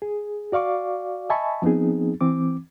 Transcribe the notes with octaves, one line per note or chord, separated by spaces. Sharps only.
G#4
F#4 D5 F5 C#6 D6
D#5 E5 G#5 A5 B5 C#6
F3 B3 C4 D#4 G#4
E3 C4 D6